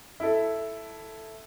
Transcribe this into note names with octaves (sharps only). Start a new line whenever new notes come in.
E4 A4